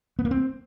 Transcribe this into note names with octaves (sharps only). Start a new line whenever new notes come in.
B3
A#3
C4